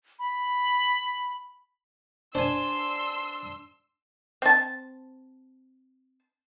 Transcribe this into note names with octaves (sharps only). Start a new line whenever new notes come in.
B5
D4 C5 G#5 C6 E6
C4 A5